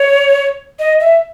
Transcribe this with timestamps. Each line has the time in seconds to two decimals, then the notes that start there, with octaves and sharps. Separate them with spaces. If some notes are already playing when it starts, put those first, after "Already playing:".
Already playing: C#5
0.79 D#5
1.00 E5